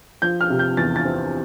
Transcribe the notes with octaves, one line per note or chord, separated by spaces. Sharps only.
F3 G6
F6
C3
G6
E2 A6
A6
C4